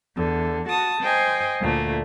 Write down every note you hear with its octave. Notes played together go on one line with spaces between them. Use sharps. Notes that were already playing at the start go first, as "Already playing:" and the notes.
E2 D3
F#4 A5 D#6
C5 D#5 G5 G#5
D2 A#2 A3